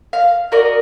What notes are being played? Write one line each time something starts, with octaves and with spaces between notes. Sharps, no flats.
F5
F#4 A#4 D5 D#5